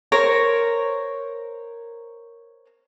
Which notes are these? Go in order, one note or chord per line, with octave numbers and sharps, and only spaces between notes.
A#4 C5 C#5 A#5